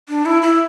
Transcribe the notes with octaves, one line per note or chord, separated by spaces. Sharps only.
D4
E4
E4